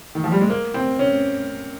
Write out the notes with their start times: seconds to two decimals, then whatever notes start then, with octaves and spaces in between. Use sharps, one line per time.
0.15 D#3
0.24 F3
0.32 G3
0.41 G#3
0.50 A#3
0.74 C4
0.99 C#4